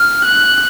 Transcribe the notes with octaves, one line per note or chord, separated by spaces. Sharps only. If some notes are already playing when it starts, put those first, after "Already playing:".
Already playing: F6
F#6